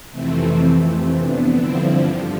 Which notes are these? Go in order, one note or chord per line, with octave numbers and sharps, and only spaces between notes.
F2 C3 E3 A3 C4
A3 C4
B3 D4
G2 D3 F3 C4 E4